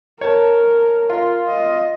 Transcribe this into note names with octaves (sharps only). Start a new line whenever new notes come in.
A#4 C#5 A5
F4 A#4
D#5